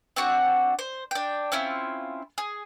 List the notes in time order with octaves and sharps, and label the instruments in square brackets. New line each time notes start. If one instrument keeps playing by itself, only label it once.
[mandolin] C4 D4 F#4 F#5
C5
D4 G5
C4 C#4 E4 F4
G#4